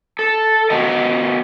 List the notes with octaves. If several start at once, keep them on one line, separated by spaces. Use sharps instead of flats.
A4
B3 F#4 G4 A#4 D#5